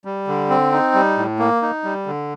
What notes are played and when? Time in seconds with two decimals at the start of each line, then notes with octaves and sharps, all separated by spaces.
0.05 G3
0.28 D3
0.50 C4
0.72 D#4
0.94 G3
1.17 A2
1.39 A#3
1.62 D#4
1.84 G3
2.06 D3